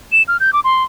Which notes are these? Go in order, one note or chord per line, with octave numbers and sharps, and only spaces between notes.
E7
F6
G6
D6
C6